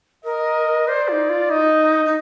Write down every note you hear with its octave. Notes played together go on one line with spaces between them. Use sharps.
A#4 D#5
C5 D5
F4
D#4
F4
D#4 D#5
D#4